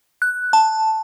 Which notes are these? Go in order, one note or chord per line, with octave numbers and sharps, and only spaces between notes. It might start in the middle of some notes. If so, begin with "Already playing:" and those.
F#6
A5